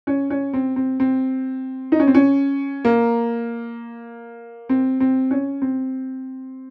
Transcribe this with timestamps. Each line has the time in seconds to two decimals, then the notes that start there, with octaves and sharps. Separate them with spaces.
0.07 C#4
0.30 C#4
0.53 C4
0.76 C4
1.00 C4
1.92 D#4
2.00 C#4
2.07 C4
2.15 C#4
2.85 A#3
4.69 C4
5.00 C4
5.31 C#4
5.62 C4